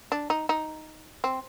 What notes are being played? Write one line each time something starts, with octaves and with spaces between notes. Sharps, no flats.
D4
D#4
D#4
C4